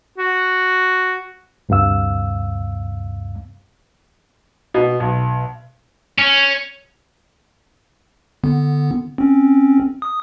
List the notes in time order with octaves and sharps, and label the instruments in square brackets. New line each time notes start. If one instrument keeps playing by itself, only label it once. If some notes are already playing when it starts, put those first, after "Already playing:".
[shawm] F#4
[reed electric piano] D2 G2 C3 F5 E6
[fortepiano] B2
B1
[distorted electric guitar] C#4
[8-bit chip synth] D3 B3
C4 C#4
D#6